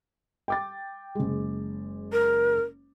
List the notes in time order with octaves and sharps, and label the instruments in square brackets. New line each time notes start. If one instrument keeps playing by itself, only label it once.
[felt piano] G5 D6 A6
F#1 G#3
[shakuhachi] A#4